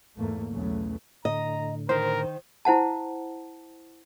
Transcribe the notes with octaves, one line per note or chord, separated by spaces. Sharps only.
E2 G#2 A3 A#3
B1 E2 C#3 F#3 A3
A2 D3 D#5 A#5
D#3 A#4 C5
E4 C5 F#5 A5